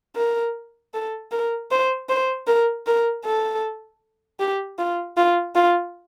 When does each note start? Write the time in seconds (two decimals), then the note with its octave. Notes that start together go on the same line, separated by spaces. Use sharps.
0.16 A#4
0.94 A4
1.31 A#4
1.71 C5
2.09 C5
2.47 A#4
2.87 A#4
3.24 A4
4.40 G4
4.79 F4
5.17 F4
5.55 F4